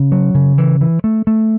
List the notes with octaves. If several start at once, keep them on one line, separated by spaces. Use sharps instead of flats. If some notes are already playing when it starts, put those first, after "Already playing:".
Already playing: C#3
F#3
C#3
E3
E3
A3
A3